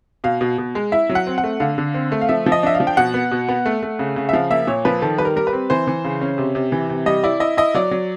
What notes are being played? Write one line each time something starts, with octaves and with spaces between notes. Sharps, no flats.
B2 F5
B2
B2
G#3
E4 E5
F#3
F#5
C4
F#5
A3
D3 F5
D3
C4
A3
F5
F3 E5
F3
D#5
D4 E5
F5
F3
G5
B2 F#5
B3
B2
B3
A3
A3
C#3
C#3
E5
F3 F5
A#3 E5
A#2 C#5
F3 B4
D#3 A4
G3 B4
A#4
G3 A#4
B4
C4
E3 C5
E3
C#3
C#4
C3
C3
E3
C3
G3 D#5
E4 D5
E4 D#5
E4 D#5
F#3 D5
F#3